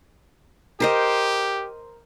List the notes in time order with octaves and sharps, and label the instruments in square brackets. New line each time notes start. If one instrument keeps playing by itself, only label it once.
[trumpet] G4 [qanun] A#4 C5 D#5